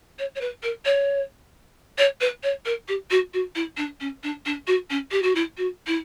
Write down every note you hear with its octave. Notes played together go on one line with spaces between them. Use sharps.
C#5
C#5
B4
A#4
C#5
C#5
B4
C#5
A#4
G4
F#4
F#4
E4
D4
C#4
D4
D4
F#4
C#4
G4
F#4
E4
F#4
E4